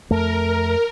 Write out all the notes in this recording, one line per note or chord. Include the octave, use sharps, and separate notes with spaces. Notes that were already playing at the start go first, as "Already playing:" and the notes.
F2 A3 A#4